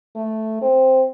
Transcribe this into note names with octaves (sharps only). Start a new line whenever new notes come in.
A3
C4